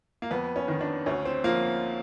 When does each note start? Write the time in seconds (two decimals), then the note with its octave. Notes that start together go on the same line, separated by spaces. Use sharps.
0.22 A#3
0.31 F2 B3
0.56 C#4
0.68 D#3
0.81 D4
1.06 D2 C#4
1.25 C4
1.44 F3 A#3